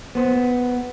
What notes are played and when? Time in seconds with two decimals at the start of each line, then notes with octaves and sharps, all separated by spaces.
0.15 B3 C5